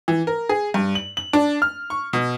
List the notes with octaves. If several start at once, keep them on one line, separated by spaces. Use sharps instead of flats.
E3
A#4
G#4
G2
F#7
F#7
D4
F6
C#6
B2